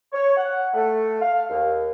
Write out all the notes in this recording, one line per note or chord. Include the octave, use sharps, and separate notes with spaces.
C#5
F#5
A3
F5
D#2